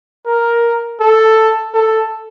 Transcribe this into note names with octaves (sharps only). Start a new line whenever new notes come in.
A#4
A4
A4